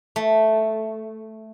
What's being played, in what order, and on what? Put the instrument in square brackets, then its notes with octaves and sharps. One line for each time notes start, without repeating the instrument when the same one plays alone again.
[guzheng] A3